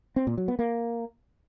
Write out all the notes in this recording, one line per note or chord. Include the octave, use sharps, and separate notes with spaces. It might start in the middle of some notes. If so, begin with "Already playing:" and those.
C4
A#2
F#3
B3
A#3